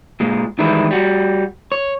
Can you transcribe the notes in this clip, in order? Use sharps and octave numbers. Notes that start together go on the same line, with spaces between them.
A#2 G#3
D#3 E3 G3 G#3 E4
G3 F#4
C#5